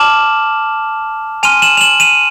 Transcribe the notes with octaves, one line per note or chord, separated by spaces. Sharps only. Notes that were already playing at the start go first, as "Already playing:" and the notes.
Already playing: A5 D6 F6 E7 F#7
G#5 C6 F6 D#7 F7
E7 F#7
F7
E7 F#7
D#7 F7